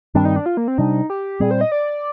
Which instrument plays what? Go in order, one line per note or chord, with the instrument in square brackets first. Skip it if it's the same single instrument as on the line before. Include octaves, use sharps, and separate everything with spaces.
[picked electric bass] G2 D#3 G3 C4 [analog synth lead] D4
[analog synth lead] D#4
D4
F4
A#3
C4
[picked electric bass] C3 G3 D4 [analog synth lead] D#4
[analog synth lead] G4
[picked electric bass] A#2 G3 C4 [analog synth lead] G#4
[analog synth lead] C5
D#5
D5